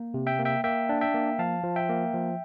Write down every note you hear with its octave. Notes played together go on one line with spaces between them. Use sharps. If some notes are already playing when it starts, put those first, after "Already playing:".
Already playing: A#3
C3
E5 G5
A#3
E5 G5
A#3 E5 G5
D4
E5 G5
A#3
F3 F5 A5
F3
E5 G5
A#3
F3